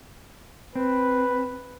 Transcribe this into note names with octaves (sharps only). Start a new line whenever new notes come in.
C4 B4